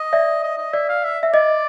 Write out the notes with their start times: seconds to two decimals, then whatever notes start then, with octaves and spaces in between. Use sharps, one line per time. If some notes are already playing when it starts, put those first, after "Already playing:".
Already playing: D#5
0.13 D5 E5
0.44 D#5
0.58 D#5
0.74 D5 E5
0.89 F5
1.04 E5
1.23 E5
1.33 D5 D#5